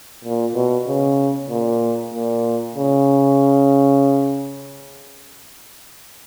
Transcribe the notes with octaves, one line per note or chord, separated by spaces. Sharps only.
A#2
B2
C#3
A#2
A#2
C#3